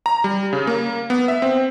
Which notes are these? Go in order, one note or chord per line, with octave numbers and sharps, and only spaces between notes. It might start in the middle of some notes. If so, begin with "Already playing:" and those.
A#5
G3
C#3
A#3
B3
E5
C4